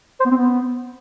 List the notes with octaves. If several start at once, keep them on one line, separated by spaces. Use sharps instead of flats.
C5
B3
C4
B3